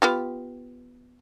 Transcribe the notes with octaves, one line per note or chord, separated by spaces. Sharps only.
B3 F4 G4